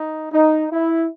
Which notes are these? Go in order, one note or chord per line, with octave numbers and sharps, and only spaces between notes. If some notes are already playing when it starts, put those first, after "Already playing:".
Already playing: D#4
D#4
E4